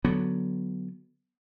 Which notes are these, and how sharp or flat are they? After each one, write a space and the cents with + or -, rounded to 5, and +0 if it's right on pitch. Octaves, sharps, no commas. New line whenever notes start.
D3 +0 F#3 +0 B3 +0